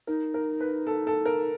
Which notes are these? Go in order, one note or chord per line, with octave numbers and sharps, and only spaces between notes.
D#4 A#4
A#4
B4
A4
A4
A#4